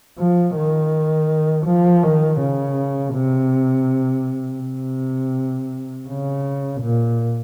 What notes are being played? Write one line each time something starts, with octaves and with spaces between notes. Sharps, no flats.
F3
D#3
F3
D#3
C#3
C3
C3
C#3
A#2